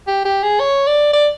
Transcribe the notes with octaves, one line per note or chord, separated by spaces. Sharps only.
G4
G4
G#4
C#5
D5
D5